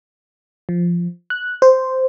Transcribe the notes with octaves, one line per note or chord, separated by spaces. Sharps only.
F3
F#6
C5